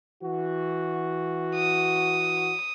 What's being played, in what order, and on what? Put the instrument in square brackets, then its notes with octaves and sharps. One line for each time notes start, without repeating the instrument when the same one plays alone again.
[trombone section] E3 F#4
[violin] D#6